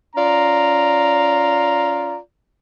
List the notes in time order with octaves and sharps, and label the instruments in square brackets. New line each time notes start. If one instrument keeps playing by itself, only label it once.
[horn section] C#4 F4 D5 A#5